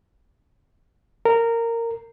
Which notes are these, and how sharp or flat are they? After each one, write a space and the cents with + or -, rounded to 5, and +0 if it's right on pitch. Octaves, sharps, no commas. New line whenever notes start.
A#4 -15